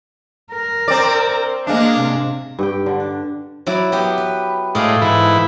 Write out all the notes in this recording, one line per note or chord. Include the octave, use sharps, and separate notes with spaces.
A#4
C4 D5
G#3 A#3 D4 F5
C3
G2 G4 G5
D3
D4
F#3 E4 D5
F#3 B3 G4
B4
A2 G#3 A4 D5 F5
G#2 E3 E4